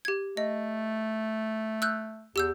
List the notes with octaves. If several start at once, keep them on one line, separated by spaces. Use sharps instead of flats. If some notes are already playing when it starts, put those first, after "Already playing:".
G4 G#6
A3 D#5
E6 F#6 G6
E2 G4 E6 G6